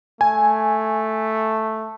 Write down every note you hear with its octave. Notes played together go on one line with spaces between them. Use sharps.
A3 G#5